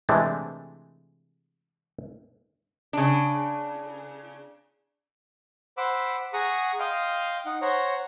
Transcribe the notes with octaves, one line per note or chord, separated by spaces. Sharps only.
C3 E3 G#3 A3 C4 D4
C#3 D4
C5 F#5 B5 D6 E6
G#4 F#5 A#5 C#6 D#6
D#5 F5 G5 C6 D#6 F6
D#4 F#5
C5 C#5 F#5 A#5